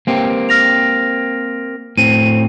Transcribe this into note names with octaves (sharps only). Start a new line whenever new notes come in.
A#3 C4 G4
F6 A#6 F7
A2 C4 D#7